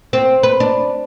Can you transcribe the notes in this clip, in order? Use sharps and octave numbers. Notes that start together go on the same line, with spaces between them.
C4
B4
D4